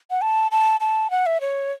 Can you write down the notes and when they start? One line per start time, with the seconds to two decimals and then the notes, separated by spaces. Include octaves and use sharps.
0.11 F#5
0.22 A5
0.51 A5
0.80 A5
1.11 F#5
1.26 E5
1.41 C#5